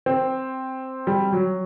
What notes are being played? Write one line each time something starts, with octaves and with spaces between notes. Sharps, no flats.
C4
G3
F#3